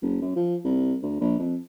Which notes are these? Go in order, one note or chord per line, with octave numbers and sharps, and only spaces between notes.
F#1
F#2
F3
C2
D2
A#1
F2